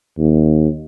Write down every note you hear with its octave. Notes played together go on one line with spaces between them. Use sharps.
D#2